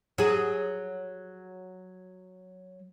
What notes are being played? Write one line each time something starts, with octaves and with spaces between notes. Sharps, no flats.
F#3 G#4